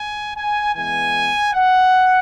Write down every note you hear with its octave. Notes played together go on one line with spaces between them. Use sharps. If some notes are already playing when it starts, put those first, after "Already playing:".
Already playing: G#5
G#5
E3 G#3 B3 G#5
F#5